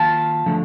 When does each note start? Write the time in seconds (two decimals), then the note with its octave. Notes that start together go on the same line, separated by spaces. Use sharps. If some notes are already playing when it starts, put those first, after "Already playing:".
Already playing: D#3 A#3 F4 F5 A5
0.46 D3 F3 A3